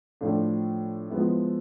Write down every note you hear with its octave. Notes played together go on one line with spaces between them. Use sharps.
A2 F3 A3 D4 F4
F3 G#3 B3 E4